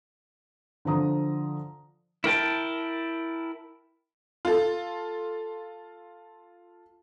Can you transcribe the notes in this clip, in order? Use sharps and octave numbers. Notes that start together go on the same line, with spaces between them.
D3 F3 A#5 D#6
E4 A#4 G5 A5
F4 A4